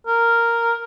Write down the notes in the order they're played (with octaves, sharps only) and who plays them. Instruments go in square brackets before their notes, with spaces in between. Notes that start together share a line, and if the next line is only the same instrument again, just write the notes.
[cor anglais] A#4